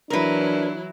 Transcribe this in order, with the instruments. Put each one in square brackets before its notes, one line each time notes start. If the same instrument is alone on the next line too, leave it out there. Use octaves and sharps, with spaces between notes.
[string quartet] E3 F#3 E4 [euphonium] D4 [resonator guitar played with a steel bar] A#4 B4